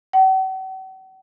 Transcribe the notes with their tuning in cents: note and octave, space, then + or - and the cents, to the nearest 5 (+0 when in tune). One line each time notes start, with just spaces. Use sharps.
F#5 +45